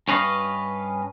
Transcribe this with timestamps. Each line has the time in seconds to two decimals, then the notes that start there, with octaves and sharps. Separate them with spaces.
0.08 G2 C#4 B4 D#5 F5